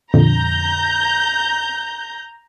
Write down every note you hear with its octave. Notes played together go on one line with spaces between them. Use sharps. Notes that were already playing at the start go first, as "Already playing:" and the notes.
F2 A#2 D3 A#5 G6